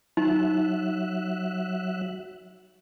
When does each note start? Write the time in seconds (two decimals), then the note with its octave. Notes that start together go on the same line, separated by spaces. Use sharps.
0.17 F#3 D#4 E5 F#6